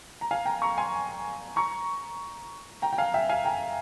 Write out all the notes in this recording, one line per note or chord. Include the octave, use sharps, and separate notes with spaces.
A#5
F5 G#5
G5 A#5
A#5 C#6
G#5 C6
A#5 C#6
G5 A#5
G5
F5 G#5
E5 G5
F5 G#5
G5 A#5